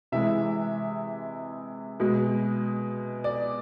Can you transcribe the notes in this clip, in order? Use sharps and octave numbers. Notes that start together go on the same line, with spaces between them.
C3 E3 G#3 E5
B2 G#3
D5